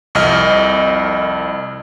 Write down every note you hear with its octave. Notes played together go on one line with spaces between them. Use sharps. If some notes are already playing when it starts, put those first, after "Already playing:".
C2 F2 D#5 F6